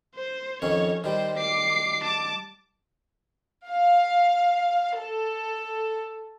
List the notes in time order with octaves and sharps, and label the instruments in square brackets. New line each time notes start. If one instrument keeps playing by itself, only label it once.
[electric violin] C5
[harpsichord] F2 D#3 C#4 [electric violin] C#5
[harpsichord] D#3 G3 [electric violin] C5
[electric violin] D6 C7
A5 D6
[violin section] F5
A4